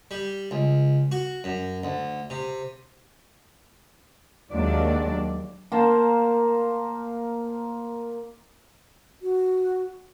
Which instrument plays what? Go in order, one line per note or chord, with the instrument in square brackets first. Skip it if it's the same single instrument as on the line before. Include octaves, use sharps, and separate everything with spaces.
[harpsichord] G3
C#2
F#4
F#2
D2
C3
[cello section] D#2 F#3 G#3 D4 D5
[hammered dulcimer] A#3 A#4 C5 A5
[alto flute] F#4